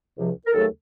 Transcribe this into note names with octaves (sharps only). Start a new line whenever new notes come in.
C#2 C3 F3
A#4
D#2 C#3 F#3 A3 A4